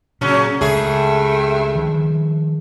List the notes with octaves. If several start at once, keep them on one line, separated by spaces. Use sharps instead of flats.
A#2 C#3 F#3 C#4
C#2 G2 A3 G#4 E5
D#3 F3